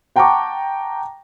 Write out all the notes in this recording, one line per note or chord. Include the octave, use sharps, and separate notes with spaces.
F#5 G5 A5 A#5 C#6 D6